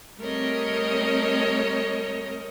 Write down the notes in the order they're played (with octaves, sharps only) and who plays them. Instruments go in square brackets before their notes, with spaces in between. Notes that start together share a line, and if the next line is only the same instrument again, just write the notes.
[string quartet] G3 A3 C4 A#4 C#5 D#5